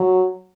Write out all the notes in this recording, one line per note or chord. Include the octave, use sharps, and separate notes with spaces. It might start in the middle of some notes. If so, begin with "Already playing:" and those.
Already playing: F#3